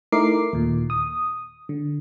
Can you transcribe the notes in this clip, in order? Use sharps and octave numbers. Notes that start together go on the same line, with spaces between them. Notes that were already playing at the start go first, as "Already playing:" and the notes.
A3 D#4 E4 A#4 D6 C7
D#2 A#2
D#6
D3